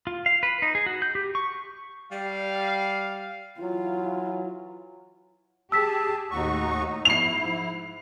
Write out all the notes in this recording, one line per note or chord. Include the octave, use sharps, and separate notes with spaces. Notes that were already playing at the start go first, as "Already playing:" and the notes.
F4
F5
B4
D#4
G#4
F#4
G6
G4
C#6
G3 F5
E3 F#3 F4
G4 G#4 A5 E6 B6
D#2 A2 D#4 F#4 C#6
G#2 F3 E4 C7 F7